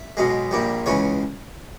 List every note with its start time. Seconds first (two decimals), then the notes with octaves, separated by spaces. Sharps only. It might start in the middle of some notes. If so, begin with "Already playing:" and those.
Already playing: E5
0.17 B1 B2 G#3
0.51 A#1 A#2 G3
0.86 C#2 C#3 E3 C#5